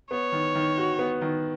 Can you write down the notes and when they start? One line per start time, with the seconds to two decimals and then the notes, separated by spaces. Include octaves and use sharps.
0.11 B3 C#5
0.32 D#3
0.55 D#3
0.78 F#4
0.99 B3
1.21 D#3